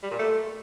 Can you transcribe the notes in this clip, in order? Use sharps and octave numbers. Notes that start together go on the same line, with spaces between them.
G3
A#2
A3